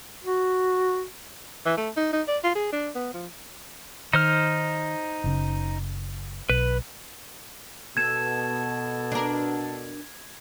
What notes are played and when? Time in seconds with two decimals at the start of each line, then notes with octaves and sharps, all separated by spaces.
0.24 F#4
1.66 E3
1.77 A3
1.97 D#4
2.13 D#4
2.28 D5
2.44 F4
2.55 G#4
2.73 D4
2.95 B3
3.14 F3
4.13 D#3 D#4 C5 F6
5.24 F#1 C#3
6.50 B1 B4
7.97 B2 A4 G#6 E7
9.12 D4 A#4